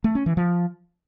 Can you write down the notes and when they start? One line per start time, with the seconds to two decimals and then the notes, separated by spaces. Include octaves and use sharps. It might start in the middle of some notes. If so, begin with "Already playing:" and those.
0.04 A3
0.15 C#4
0.26 E3
0.37 F3